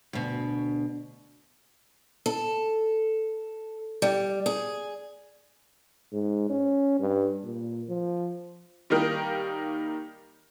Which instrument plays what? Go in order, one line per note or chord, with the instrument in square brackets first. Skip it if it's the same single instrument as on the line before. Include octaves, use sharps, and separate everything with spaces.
[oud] D2 B2
[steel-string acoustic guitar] A4
G3
G#4
[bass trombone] G#2
C#4
G2
A#2
F3
[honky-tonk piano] D#3 G3 A#3 D#4 G4 A#4